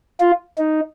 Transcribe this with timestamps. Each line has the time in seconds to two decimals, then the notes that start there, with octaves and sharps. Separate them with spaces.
0.20 F4
0.58 D#4